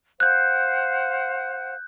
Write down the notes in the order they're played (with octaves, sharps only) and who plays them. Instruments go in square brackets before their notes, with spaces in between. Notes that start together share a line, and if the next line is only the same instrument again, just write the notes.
[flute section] C5 F5 F#5 [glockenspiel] F#6 G6